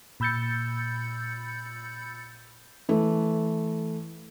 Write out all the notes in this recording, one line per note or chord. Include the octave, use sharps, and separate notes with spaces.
A#2 B5 E6 G6 A6 C#7
E3 A3